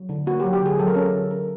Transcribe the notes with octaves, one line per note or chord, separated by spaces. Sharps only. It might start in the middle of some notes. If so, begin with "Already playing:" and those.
Already playing: F#3
D3
A#3 F#4
G4
F#3
G4
D3 G#4
F#3 A4
A#4
C#4 A4
D3
D3 A#4